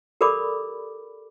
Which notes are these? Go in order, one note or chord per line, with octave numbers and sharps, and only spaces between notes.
G4 A4 A#4 D5 B5 D6